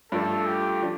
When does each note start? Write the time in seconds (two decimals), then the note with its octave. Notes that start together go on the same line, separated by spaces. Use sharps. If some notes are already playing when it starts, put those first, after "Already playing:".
0.12 G2 F3 A3 D4 A4
0.47 G4
0.82 F3 D4